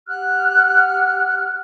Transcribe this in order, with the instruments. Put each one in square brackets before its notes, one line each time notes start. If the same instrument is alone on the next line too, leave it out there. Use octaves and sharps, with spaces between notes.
[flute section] G4 F#5 F6 F#6